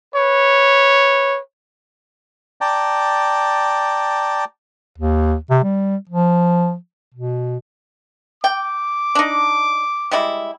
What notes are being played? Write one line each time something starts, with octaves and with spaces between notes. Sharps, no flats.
B4 C#5
D5 G5 A5 A#5
D#2
C3
G3
F3
B2
G5 D6
D4 D#4
G3 G#3 E4